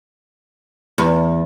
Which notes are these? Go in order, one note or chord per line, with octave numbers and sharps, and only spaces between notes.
E2